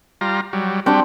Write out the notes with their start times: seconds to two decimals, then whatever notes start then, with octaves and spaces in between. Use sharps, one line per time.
0.21 G3 F4 A#5
0.53 F#3 G3
0.86 G3 C4 D4 F#4 G4